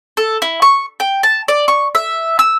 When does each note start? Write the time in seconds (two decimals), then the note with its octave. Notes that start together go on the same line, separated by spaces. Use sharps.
0.17 A4
0.42 E4
0.62 C#6
1.00 G5
1.23 A5
1.48 D5
1.68 C#6
1.95 E5
2.39 E6